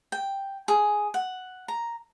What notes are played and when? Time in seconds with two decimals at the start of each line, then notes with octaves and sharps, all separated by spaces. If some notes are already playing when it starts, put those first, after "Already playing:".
0.12 G5
0.68 G#4
1.14 F#5
1.68 A#5